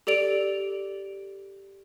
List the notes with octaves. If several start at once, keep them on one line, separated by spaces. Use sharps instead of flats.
G4 A4 D5 D7 F7